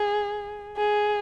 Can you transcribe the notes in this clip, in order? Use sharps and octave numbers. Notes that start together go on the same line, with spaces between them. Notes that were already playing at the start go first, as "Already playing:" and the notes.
Already playing: G#4
G#4